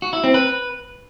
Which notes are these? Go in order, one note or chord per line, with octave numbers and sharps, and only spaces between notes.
F#4
E4
C4
B4